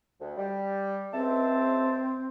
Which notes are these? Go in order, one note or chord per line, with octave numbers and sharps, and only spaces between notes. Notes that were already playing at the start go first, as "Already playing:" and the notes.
D2
G3
C#2 C4 E5 A5